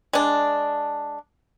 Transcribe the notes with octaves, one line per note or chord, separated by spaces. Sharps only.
G#3 D4